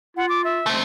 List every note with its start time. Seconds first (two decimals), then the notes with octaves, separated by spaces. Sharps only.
0.17 F4 F#5
0.29 D6
0.44 E5
0.66 A3 C4